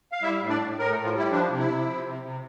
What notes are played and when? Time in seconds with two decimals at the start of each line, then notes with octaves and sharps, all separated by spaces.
0.12 F5
0.22 G3 E4 E5
0.40 A2
0.49 D4 D5
0.59 A2
0.76 A2 A#4
0.90 A3 A4
0.95 A2
1.04 F3 F4
1.13 G3
1.18 E4
1.32 F3 D4
1.49 C3
1.59 E4
1.67 C3
1.87 F3
2.04 C3
2.23 C3